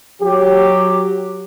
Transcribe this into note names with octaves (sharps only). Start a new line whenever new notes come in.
F#3 G4